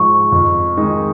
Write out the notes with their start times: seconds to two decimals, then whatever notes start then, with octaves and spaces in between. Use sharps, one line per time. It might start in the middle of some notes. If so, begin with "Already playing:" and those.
Already playing: G#2 F3 G#3 C#6
0.32 F2
0.77 D#3 G#3 D#4